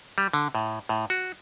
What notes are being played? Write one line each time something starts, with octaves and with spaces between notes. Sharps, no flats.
G3
D3
A2
A2
F#4